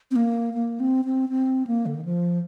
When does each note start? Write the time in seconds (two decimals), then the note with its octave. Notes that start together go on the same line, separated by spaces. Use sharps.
0.11 C4
0.16 A#3
0.54 A#3
0.80 C4
1.05 C4
1.29 C4
1.67 A#3
1.86 D3
1.95 D#3
2.05 F3